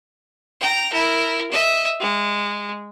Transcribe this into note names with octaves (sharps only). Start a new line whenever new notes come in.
G5 A#5
E4 A#4
D#5 E5
G#3